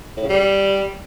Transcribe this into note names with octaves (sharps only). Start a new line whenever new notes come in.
A2
C#3
G3